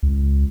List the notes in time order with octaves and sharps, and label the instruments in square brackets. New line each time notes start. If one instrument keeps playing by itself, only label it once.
[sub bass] C#2